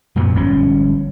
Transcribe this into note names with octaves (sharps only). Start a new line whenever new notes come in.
F#2 A#2 D3 B3
G1 G#2 F3 C#4